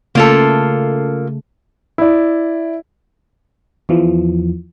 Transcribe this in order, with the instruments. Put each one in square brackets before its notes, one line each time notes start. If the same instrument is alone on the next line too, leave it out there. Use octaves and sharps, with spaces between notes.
[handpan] C#3 A3 [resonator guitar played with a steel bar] A#3 F4 A4
[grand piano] E4 D5
[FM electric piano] E2 E3 F3